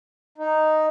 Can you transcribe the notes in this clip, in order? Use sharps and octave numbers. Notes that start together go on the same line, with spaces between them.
D#4